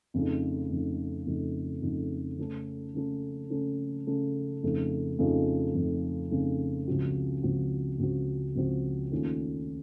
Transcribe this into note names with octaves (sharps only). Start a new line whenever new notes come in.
F2 C#3 A3 D#4
F2 C#3 A3 D#4
F2 C#3 A3 D#4
F2 C#3 A3 D#4
C#3 A3 C#4 A4
C#3 A3 C#4 A4
C#3 A3 C#4 A4
C#3 A3 C#4 A4
F2 C#3 F3 A3 D#4
F2 C#3 F3 A3 D#4
F2 C#3 F3 A3 D#4
F2 C#3 F3 A3 D#4
C#2 C#3 F3 C4 F#4
C#2 C#3 F3 C4 F#4
C#2 C#3 F3 C4 F#4
C#2 C#3 F3 C4 F#4
D#2 D#3 A3 C#4 F4